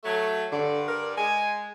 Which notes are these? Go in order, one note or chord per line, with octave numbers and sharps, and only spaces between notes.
F#3 A3
G2 D3 D5
A#4
G#3 G#5